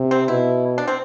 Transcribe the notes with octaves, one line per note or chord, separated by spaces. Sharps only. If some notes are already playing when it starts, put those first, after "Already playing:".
Already playing: C3
C4
B2 E4
D4
C4